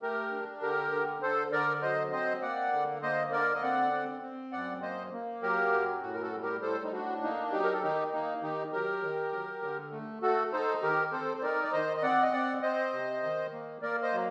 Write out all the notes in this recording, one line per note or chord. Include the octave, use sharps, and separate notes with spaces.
A3 G4 A#4
D4
D3 G4 A#4
D3
D3 A4 C5
D3 A#4 D5
F#3 C5 D#5
C4 C5 D#5
A#3 D5 F#5
D3
A#3 C5 D#5
D3 A#4 D5
D#5
C4 D5 F#5
C4
C4
F#2 D5 F#5
A#3 C5 D#5
A#3
F#3 G4 A#4
F#2
A2 F#4
A#4
F#4 A4
G3
G4 A#4
A2 A4 C5
D#4
D4 F#4
A#3 D#4
F#3 D#4 G4
A#4
A4
D#3 D#4 G4
A#3 D#4
D#3 D#4 G4
F#3 G4 A#4
D#3
F#3
D3
A3
A3 F#4 A4
D#4 A4 C5
D#3 G4 A#4
C4 A4 C5
C5
D#4 A#4 D5
D5
D#3 C5 D#5
D#5
C4 D5 F#5
D#5
C4 D5 F#5
C4 C5 D#5
C3
D#3
A#3
A#3 A#4 D5
C5 D#5
F#3